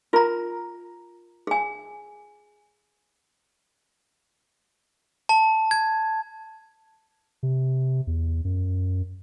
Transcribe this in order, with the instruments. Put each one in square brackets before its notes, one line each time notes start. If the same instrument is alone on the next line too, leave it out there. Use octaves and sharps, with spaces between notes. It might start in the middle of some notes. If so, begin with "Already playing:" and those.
[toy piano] F4 A#5 [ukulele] A#4
[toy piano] G#4 G#5
[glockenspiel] A5
G#6
[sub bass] C3
E2
F#2